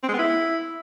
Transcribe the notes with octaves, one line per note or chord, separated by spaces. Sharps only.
C4
G#3
B3
E4